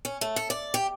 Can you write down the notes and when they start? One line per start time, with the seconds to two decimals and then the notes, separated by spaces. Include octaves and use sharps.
0.05 C#4
0.21 A3
0.36 A4
0.50 D5
0.74 G4